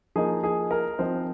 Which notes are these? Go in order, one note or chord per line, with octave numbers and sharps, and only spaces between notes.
F3 A#3 D#4 G#4
G#4
A#4
F3 C4 D#4 C5